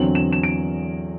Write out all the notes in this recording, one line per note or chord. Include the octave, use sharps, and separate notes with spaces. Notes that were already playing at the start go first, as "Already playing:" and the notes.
Already playing: E2 D3 F#3 C4 F#7
E7
E7
D7